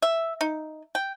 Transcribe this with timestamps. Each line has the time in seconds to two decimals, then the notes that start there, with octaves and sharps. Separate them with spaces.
0.02 E5
0.41 D#4
0.95 G5